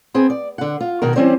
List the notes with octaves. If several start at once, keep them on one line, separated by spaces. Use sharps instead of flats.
B3 C4 G#4
D5
D3 F#5
F4
B2 D#3 F#4 A#4
E3 G3 C4 C#4 C5 D5